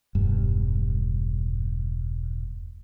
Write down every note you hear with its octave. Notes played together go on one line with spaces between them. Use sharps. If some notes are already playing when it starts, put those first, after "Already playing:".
E1 G2